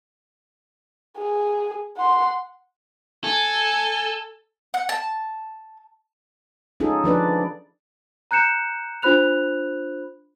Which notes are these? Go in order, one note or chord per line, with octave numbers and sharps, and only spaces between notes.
G#4
F#5 C6
A4 G#5
F#5
A5
C#4 D#4 F4 G#4 A4
F3 D4 B4 D5
A#5 F#6 G6 C#7 E7
D4 F4 C5 B5 F#6 F7